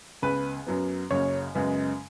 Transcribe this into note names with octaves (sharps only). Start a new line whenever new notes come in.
C#2 C#3 B3 B4
F#2 F#3 B3
F#1 F#2 C#3 C#5
F#2 C#3 G#3 B3